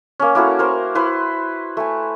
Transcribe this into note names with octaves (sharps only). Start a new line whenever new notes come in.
A#3 C#4
A#3 E4 F#4 A4
A#4 C5
E4 B4 C5 C6
A3 G#5